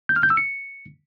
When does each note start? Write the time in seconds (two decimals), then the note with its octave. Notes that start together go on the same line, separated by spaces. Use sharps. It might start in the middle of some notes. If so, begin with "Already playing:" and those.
0.09 G6
0.16 F6
0.23 G6
0.30 E6
0.37 C#7